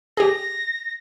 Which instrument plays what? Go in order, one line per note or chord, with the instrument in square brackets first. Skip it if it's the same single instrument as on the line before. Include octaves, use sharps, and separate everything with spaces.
[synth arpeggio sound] G4 G#4 [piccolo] A#6